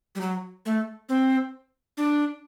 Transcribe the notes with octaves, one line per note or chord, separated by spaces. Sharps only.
G3
F#3
A3
C4
D4